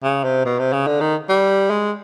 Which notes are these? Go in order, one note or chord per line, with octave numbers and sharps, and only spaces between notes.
C#3
C3
B2
C3
C#3
D3
D#3
G3
G#3